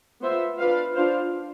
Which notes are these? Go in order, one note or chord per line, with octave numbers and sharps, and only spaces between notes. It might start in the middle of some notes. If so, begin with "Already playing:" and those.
B3 F4 C5 E5
D4 F4 B4 F5
D4 F4 C5 F5